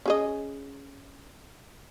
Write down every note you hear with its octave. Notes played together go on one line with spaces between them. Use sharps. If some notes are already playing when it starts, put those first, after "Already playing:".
C#4 G#4 D#5